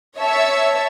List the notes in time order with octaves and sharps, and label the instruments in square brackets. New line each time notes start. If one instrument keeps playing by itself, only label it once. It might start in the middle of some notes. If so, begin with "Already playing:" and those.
[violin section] C#5 E5 A5 E6